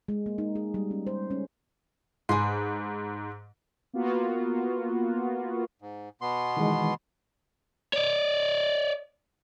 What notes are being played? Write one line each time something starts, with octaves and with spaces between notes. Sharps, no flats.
G#3
A#3
D#4
G#4
G3
C#4
C5
C#4
G#2 G#4 B4 C6
A#3 B3 F4 F#4
G#2
B2 B3 C6
D#3 E3 G#3
C#5 D5